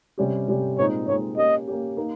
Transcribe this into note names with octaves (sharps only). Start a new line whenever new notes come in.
C3 G3 C#4 G4
C3 G3 C#4 G4
A#2 G#3 C4 D#4 C#5
A#2 G#3 C4 D#4 C#5
A#3 C#4 G4 D#5
A#3 C#4 G4
A#3 D#4 A#4